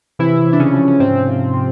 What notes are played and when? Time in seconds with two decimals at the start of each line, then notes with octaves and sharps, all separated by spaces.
0.19 C3 E3 E4
0.46 C3
0.53 D4
0.60 C#3 C#4
0.73 F3
0.88 C#4
1.00 G#2 C3 C4
1.27 F3
1.54 F3